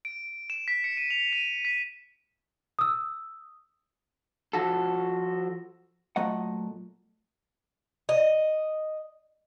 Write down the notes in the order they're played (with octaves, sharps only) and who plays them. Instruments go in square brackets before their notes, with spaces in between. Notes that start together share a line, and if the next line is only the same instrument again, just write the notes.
[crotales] D7
E7
B6
C#7
D#7
F7
D#7
B6
[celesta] D#6 E6
[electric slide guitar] F3 F#4 A4
[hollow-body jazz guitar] A#2 F#3 A3 D#5 F#5
[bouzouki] D#5